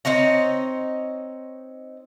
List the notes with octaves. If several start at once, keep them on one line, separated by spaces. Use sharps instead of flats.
C4 D#4 C#5 D#5